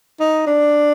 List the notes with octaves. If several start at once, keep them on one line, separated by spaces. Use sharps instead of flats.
D#4
D4